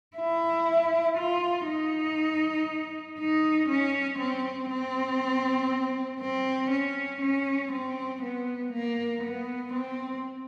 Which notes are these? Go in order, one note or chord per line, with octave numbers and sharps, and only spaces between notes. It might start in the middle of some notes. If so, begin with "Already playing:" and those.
E4
F4
D#4
D#4
C#4
C4
C4
C4
C#4
C#4
C4
B3
A#3
B3
C4